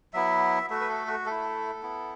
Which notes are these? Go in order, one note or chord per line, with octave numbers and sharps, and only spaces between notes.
F#3 B3 E4 E5
A3 F#4 E5
B4
A4
F#4
A3 E4 A4
B3 E4